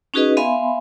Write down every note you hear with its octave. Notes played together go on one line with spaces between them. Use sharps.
C#4 D#4 F#4 G#4 B4 D#5
B3 E5 F5 G#5 B5 C6